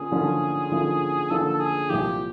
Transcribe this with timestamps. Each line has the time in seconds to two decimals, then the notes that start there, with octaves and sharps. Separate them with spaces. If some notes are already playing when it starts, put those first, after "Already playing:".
Already playing: D3 A#3 C#4 F4 G#4
0.12 D3 F3 A#3 C#4 F4
0.71 D3 F3 A#3 C#4 F4
1.30 D3 F3 A#3 C#4 F4 A4
1.49 A4
1.60 G#4
1.90 C2 A#2 F3 G4